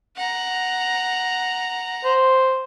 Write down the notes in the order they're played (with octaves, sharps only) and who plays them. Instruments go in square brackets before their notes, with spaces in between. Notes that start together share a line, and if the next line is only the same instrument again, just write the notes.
[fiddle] F#5 A#5
[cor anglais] C5